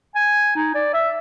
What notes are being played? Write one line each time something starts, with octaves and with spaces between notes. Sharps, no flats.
G#5
D#4
D5
E5